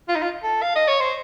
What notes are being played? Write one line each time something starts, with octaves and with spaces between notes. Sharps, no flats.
F4
D#4
F4
A4
F5
D#5
C#5
C5